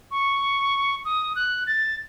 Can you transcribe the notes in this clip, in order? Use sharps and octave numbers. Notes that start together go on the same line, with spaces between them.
C#6
D#6
F#6
A6